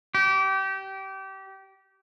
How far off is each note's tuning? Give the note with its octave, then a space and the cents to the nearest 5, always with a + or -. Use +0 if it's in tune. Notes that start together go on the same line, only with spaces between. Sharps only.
G4 -25